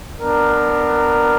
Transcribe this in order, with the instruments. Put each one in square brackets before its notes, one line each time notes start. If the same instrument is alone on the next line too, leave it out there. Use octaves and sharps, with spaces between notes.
[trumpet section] B3 D4 A#4